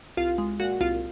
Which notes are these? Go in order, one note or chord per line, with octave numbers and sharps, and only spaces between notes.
C2 F4 F5
G#3
A#2 F#4 F#5
C2 F4 F5